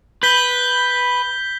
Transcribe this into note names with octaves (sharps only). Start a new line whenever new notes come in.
B4 G6 B6 G7